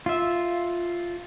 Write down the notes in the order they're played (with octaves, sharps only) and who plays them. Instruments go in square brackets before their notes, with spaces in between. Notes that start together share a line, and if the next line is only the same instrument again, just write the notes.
[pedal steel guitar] F4 E5